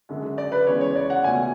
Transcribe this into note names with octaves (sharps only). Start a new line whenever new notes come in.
F#2 D3 G#3
D5
B4
E2 C#3 G#3 C#5
C#5
D5
F#5
C#2 B2 A3 G#5